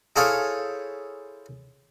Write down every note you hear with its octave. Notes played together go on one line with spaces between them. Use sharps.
E4 G#4 A4 C5 C#5 F5